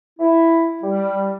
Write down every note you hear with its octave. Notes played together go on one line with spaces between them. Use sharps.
E4
G3